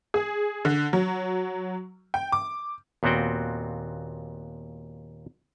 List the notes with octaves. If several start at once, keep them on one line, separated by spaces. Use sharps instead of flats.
G#4
D3
F#3
G5
D6
D#2 A#2 B3 C4 F#4 G5